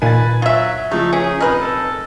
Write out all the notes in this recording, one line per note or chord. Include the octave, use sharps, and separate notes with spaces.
A#2 D#3 B4 G#5 A6
F#3 F4 E5
C#3 F3 A3 D#4
C#4 G#4
F1 D#4 A#4 B4 D#5 F6
A4